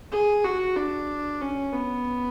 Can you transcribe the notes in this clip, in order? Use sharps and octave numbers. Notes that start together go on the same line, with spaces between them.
G#4
F#4
D4
C#4
B3